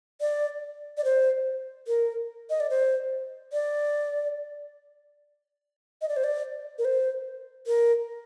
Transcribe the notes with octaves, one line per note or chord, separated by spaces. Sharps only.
D5
D5
C5
A#4
D#5
D5
C5
D5
D#5
D5
C5
D5
A#4
C5
A#4